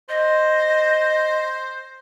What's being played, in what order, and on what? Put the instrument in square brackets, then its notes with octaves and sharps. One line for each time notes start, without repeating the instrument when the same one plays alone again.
[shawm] C5 [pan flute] D#5